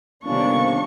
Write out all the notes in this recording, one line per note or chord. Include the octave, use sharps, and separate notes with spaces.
G1 C3 D#3 A#3 C#4 D4 C#6